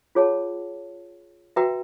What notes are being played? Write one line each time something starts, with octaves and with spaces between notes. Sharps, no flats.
F4 G#4 C#5 F#5 A5
F#4 B4 E5 G5 A#5